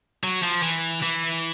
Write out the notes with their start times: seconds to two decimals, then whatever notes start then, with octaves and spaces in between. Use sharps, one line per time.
0.24 F#3
0.43 F3
0.63 E3
1.02 E3